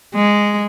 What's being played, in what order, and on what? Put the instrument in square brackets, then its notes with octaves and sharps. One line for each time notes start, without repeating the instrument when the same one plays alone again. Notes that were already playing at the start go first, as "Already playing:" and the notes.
[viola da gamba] G#3